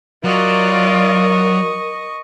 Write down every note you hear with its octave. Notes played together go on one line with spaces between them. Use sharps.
F#3 F4 A#4 D5 D#5 C#6